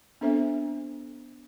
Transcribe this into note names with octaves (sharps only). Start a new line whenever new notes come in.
B3 C4 D4 A4 C5 E5